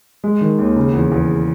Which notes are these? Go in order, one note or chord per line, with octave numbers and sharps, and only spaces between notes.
G#3
D#3
D#2
C#3
E2
E2